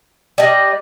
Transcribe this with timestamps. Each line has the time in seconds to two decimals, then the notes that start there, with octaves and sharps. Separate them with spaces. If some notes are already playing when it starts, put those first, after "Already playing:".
0.38 G3 D4 D#5